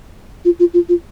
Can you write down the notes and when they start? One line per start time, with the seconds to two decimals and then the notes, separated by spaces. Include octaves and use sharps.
0.45 F4
0.60 F4
0.74 F4
0.89 F4